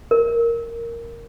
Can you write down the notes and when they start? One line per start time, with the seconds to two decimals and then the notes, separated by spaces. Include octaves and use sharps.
0.11 A#4